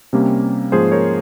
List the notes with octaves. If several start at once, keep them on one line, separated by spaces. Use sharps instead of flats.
C3 G3 A#3 C#4
G#2 F3 A#3 C#4 G#4 C5
A#4 C#5